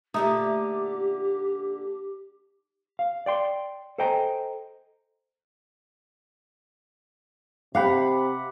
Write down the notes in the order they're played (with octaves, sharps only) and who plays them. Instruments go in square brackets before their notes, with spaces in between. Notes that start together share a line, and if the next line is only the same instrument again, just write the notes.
[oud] A#2 D3 A3 [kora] D#4 E5 [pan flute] G4
[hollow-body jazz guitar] F5
D5 G5 C6
A4 C5 D#5 G5 G#5 A#5
[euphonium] C3 [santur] G4 F#5 B5 [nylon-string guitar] F5